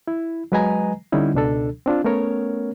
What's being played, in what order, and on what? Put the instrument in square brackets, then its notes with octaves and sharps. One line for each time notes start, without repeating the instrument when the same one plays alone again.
[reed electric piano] E4
F#3 G#3 B4 D#5 G#5 A#5
D3 G3 C#4 D#4 E4
C#2 B2 D4 A4
C4 D4 F4
A3 B3 C#4 A#4 C#5